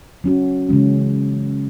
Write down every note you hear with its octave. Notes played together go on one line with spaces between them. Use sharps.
F#3 C#4 F#4
C#3 E3 G#3 C#4